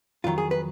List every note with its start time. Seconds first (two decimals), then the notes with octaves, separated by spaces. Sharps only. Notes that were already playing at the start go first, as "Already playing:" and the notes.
0.24 F2 D#3 F#3 F4
0.38 G#4
0.51 B4